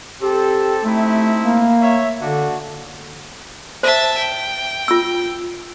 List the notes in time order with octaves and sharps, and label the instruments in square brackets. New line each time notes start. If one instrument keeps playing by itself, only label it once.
[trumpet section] C4 A4 [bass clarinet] G4
[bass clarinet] A3 [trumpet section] C4 D#4 E4
[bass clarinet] A#3
[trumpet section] C#5 E5
[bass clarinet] D3 [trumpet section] D4 F#4
[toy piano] C5 [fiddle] E5 A5
[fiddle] G5
[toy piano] F4 E6